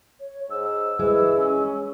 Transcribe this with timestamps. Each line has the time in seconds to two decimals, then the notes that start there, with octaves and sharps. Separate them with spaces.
0.20 C#5
0.50 G#2 E6
0.99 E3 G#3
1.37 C#4